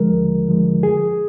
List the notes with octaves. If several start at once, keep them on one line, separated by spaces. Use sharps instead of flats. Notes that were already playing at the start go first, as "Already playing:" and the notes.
Already playing: D#2 D3 F3 G#3 A#4
D#2
D3 F3 G#3
F#2 G#4